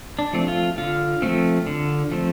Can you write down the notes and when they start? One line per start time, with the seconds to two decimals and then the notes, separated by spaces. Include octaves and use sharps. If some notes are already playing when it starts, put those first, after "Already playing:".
0.19 D4
0.33 F3 A3 C4
0.48 F4
0.78 D3 F4
1.22 F3 A3 C4
1.67 D3
2.12 F3 A3 C4